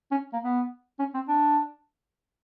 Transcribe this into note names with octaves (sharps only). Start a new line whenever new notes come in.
C#4
A#3
B3
C#4
C4
D4